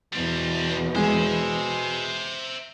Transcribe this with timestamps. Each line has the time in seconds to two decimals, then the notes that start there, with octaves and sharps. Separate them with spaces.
0.13 E2 B2 G3 C4
0.95 G#3 C5 E5